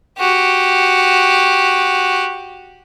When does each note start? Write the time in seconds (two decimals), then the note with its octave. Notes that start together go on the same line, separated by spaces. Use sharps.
0.19 F#4 G4